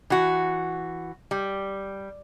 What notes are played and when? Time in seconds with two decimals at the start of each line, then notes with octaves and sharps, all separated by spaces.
0.10 E3 F#4
1.31 G3